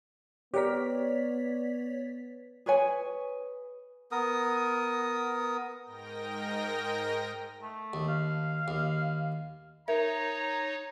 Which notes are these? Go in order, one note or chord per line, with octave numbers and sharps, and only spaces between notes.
B3 G4 A#4 C#5 D5 B6
G#4 B4 C#5 G#5
B3 A#4 D#6
G#2 A#4 D#5 G5 A#6
A3
D#2
F5
D#2
D#4 A#4 C#5 E5 A#5